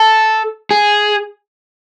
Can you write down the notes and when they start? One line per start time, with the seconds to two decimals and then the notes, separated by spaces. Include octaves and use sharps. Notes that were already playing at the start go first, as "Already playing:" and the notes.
Already playing: A4
0.71 G#4